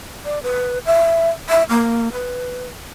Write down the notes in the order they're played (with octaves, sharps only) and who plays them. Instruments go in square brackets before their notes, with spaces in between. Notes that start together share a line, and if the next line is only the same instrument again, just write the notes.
[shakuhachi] D5
B4
E5
E5
A#3
B4